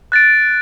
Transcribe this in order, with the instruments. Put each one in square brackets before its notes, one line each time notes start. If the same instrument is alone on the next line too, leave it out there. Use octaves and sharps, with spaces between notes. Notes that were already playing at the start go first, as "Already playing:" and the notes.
[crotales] F#6 A6 D7